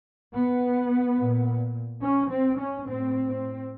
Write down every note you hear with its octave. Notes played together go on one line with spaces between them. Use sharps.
B3
A#2
C#4
C4
C#4
A2 C4
C4